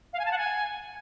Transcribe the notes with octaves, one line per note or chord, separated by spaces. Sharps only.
F5
G#5
A5
F#5
G#5